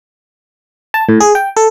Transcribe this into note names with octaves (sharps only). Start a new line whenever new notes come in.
A5
A2
G#4
G5
A4